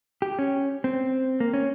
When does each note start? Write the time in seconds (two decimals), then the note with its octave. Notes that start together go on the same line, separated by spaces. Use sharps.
0.22 G4
0.39 C#4
0.84 C4
1.40 A#3
1.54 C#4